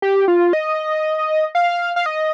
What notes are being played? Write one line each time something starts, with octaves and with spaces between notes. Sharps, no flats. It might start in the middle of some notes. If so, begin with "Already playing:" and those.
G4
F4
D#5
F5
F5
D#5